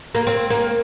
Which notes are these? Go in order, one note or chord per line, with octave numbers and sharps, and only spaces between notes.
A#3
C4
A#3